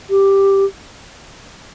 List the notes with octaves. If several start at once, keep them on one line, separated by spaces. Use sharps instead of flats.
G4